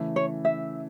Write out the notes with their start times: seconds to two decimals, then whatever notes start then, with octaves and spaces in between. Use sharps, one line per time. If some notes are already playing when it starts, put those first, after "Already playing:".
Already playing: C#3 E3 A3
0.16 C#5
0.45 E5